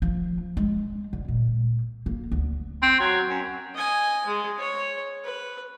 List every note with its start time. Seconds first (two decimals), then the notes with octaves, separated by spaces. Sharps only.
0.02 F3
0.57 G#3
1.13 D3
1.28 A#2
2.06 A#3
2.32 D2
2.82 C4
3.00 F#3
3.29 F#2
3.75 D#5 G#5
4.26 G#3
4.59 C#5
5.24 B4